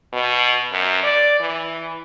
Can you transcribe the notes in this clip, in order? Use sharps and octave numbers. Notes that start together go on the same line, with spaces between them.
B2
F#2
D5
E3